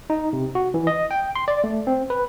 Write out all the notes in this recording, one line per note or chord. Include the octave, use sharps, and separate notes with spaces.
D#4
C3
F#4
E3
D#5
G5
C6
D5
A3
C4
B4